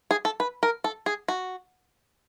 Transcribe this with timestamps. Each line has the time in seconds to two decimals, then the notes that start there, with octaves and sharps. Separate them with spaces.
0.11 G#4
0.25 A4
0.40 B4
0.63 A#4
0.84 A4
1.06 G#4
1.28 F#4